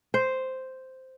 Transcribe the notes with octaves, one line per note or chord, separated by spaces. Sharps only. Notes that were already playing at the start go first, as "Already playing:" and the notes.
C5